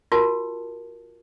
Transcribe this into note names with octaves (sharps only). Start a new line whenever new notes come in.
F4 F#4 A#4 A5